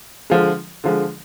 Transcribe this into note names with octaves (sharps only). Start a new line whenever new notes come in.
D3 F3 G#3
D3 F3 G#3